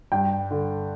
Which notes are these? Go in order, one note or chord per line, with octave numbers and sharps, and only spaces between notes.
G2 G5
D3